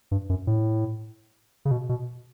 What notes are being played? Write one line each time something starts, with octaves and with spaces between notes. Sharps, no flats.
G2
F#2
A2
C#3
B2
B2